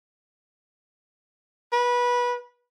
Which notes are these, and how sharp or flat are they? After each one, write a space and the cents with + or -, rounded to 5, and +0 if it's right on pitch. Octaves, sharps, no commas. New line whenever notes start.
B4 -20